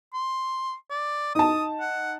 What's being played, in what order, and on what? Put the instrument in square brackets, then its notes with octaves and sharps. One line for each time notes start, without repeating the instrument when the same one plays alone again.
[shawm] C6
D5
[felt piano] D#4 A5 [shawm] D#6
[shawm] F#5